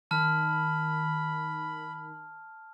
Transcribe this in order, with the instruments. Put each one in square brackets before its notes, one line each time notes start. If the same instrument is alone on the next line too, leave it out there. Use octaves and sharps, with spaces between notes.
[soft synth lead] D#3 [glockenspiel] A5 F6 [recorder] B5